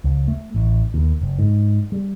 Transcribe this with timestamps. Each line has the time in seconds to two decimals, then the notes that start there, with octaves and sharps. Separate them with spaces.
0.04 C#2
0.28 A3
0.55 A1
0.94 D#2
1.21 F#1
1.39 G#2
1.92 G3